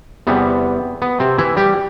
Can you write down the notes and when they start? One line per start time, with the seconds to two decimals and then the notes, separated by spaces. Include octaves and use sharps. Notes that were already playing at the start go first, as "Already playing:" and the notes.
0.27 E2 C3 E3 G3 B3
1.02 B3
1.20 C3 C4
1.38 E3 E4
1.57 G3 G4